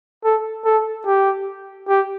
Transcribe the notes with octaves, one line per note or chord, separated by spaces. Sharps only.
A4
A4
G4
G4